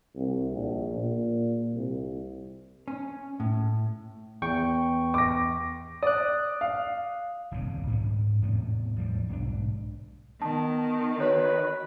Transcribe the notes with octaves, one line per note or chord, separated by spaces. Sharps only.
C2
A#1
A#2
C2
C#4
A2
E2 G5 C#6
D6 A#6
D5 D#6 F#6
F5
D#1 C2 G2 C#3
G#2 C4 C#4
E2 A2 C3 A3
A2 F3 G3
B1 G#2 G#3 D4
D#3 B3 A5
F#4 B4 C#5